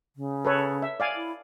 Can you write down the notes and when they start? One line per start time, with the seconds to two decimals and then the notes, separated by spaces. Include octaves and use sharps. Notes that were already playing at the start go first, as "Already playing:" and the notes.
0.16 C#3
0.45 A4 B4 C#5
0.82 E5
1.00 D5 F5 G#5
1.16 E4